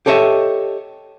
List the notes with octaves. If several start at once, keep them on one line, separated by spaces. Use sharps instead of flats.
G4 A4 C#5 D#5 E5